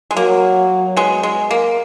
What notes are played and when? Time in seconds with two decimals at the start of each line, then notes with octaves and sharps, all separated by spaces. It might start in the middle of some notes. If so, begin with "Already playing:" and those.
0.11 G#3
0.16 F#3 A#3
0.97 G#3 B3
1.23 G#3
1.51 A#3